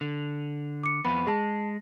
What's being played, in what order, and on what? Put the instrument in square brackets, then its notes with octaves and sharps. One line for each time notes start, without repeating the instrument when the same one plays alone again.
[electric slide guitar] D3
[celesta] D6 C#7
[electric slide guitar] F2 B3 [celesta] B5
[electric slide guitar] G#3 [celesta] G#4 A5